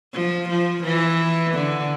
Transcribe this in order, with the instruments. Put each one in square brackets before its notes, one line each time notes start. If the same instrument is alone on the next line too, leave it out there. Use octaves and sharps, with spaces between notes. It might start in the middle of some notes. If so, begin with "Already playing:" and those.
[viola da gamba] F3
F3
E3
D3